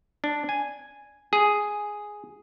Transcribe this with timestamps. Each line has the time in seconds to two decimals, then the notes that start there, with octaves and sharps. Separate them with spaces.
0.24 D4
0.49 G#5
1.33 G#4